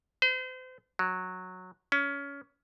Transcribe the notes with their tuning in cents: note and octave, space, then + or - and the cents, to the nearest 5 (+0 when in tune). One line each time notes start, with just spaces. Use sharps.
C5 -35
F#3 -10
C#4 +20